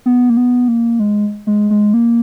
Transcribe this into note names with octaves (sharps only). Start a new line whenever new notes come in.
B3
A#3
B3
A#3
G#3
G#3
G#3
A#3